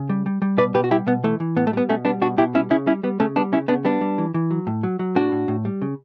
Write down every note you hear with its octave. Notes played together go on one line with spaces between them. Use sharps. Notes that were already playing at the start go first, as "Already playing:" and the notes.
Already playing: C#3
G3
G3
G3
B2 B4 D5
B2 G4 B4
F#4
G3 E4 G4
B2 B3
E3 A3
E3
A2 B3
A3
G3 B3
B2 A3 C#4
G3 B3 D4
B2 D4 F#4
B2 E4 G4
G3 C#4 E4
C#3 C#4 E4
G3 C#4 E4
G3 B3
C#3 A3 C#4
G3 B3 D4
C#3 C#4 E4
C#3 B3 D4
G3 B3 D4
G3
E3
E3
F#3
A2
F#3
F#3
A2 D4 F#4
A2
A2
G3
C#3